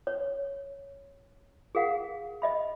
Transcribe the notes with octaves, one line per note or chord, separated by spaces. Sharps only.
C#5
G#4 A#4 F5 F#5
D#5 E5 B5